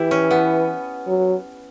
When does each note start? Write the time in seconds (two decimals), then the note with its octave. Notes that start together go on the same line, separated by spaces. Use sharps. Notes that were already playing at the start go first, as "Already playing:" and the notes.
Already playing: E3 E4 G4
0.11 C#4
0.31 B3
1.08 F#3